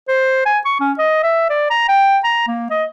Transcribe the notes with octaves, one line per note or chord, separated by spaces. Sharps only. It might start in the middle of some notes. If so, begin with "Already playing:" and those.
C5
G#5
C#6
C#4
D#5
E5
D5
A#5
G5
A#5
A#3
D#5